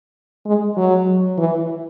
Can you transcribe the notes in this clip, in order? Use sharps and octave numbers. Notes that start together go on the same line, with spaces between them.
G#3
F#3
E3